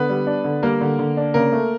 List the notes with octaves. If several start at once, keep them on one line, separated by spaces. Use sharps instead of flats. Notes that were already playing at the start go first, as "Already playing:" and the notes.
Already playing: D3 B3 B4
G3
D4
D3
G3 A#3 A#4
D3
D3
D4
C#3 A#3 A#4
A3